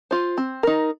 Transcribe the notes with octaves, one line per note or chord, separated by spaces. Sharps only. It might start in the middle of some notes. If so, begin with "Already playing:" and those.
F4 C5
C4
D#4 A#4